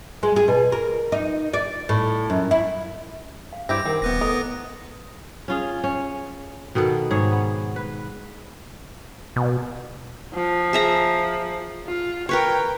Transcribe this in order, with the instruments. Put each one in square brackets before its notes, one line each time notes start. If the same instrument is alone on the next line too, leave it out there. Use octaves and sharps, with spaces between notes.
[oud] G#3
G#4
B2
A#4
D#4
D5
A2
F#2
E4
[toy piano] F5
[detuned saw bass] G2 [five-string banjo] C4 E4 G4 [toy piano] C5 D6 [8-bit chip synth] A#6
[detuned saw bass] D#3 [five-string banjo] C4 [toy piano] A#4 F#5 G5
[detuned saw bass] D#1 [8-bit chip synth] B3 B4 A#6
[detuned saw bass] A2 [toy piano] A4 D#5 D#6 [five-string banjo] A#4
[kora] C#4 F4 G#4
C#4
B2 D#3 B3 A4
G#2 G#4 C#5
B3
B4
[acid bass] B2
[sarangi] F3
[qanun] G#4 E5 A#5
[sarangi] F4
[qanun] A#4 B4 C#5 [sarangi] G5